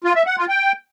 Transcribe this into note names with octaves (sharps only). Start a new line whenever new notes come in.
F4
E5
F#5
F4
G5